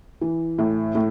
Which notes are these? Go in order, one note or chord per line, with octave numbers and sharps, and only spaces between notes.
E3
A2
A2